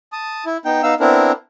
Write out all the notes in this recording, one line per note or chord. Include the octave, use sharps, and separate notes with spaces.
A5 D#6
E4
B3 D#4 G5
B3 D#4 F5 E6
B3 C4 D4 E4 A#4